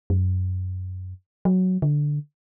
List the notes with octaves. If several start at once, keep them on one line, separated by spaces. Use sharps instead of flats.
F#2
F#3
D3